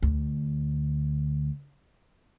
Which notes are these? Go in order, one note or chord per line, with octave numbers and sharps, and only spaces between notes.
D2 D3